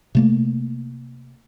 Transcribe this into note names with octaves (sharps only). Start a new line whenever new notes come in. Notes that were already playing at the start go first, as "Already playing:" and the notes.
C3 A3 A#3